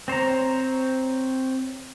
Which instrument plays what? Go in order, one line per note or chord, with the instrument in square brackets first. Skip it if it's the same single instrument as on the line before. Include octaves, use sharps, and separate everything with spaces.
[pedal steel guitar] C4 C5 C#5 A#5